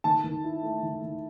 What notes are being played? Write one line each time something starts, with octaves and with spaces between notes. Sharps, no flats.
D#3 A5
D#3
E4
A3
D#3
D#3